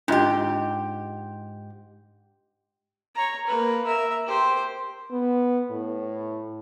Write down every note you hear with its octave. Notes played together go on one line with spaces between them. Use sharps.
G#2 D4 F4 G4 D#5
C#5 A#5
A#3 B4
A#4 E5
G4 C5
B3
A2